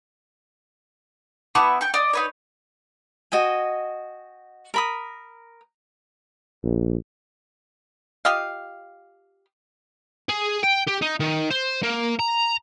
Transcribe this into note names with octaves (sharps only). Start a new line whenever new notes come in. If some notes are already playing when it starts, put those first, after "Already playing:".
B3 E4 F#5 A5 C#6 D6
G5 C#6
D5 D#5
D#4 B4 C#5
F#4 D#5 G5 G#5
A#4 B5 D#6
A#1
F4 G4 D#5 F5
G#4
G5
G4
D#4
D#3
C5
A#3
A#5